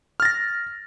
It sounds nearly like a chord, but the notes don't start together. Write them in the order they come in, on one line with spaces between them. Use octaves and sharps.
F6 A6 A#6